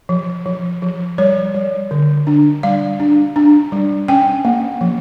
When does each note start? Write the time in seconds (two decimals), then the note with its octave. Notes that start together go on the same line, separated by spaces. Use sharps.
0.09 F3
0.46 F3
0.82 F3
1.18 G3 C#5
1.54 G3
1.91 D3
2.27 D4
2.63 G3 F5
3.00 D4
3.36 D4
3.72 G3
4.08 C#4 G5
4.45 A#3
4.81 F3